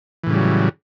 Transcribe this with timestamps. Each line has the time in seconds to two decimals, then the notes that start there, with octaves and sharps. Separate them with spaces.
0.24 E3
0.27 A2
0.30 C#3
0.33 G3
0.36 F#3